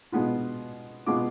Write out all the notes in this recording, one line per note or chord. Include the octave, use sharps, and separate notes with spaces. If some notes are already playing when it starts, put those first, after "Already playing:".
B2 G#3 B3 F4
B2 G#3 B3 F4 D6